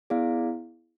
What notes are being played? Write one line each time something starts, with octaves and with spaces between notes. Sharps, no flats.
B3 E4 G#4 D5 F5